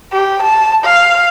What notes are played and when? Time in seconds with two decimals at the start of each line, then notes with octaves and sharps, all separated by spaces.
0.13 G4
0.43 A5
0.85 F5